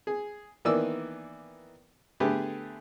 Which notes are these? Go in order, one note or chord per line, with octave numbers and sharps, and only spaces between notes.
G#4
D#3 E3 A#3 B3 D5 E6
D3 A3 B3 G4 G#4 B4